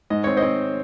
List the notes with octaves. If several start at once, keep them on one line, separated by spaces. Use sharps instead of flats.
G#2 D#5
C4 C#5
C5 D#5
C4